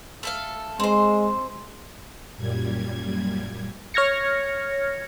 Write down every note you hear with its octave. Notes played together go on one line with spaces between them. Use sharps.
A3 A4 F5
G#3 C4 C5
F#2 A#2 G3 G#6
C#5 F6 G#6 A#6 C#7